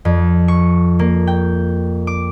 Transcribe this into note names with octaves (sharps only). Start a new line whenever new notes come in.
F2
C#6
A#3
G5
D6